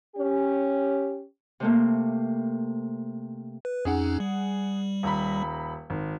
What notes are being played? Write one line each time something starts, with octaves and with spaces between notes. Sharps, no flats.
C#4 G4
C3 A3 A#3
B4
F2 C#4 D#4 G#4 F#5
G3
D#1 A#5 B5
G#1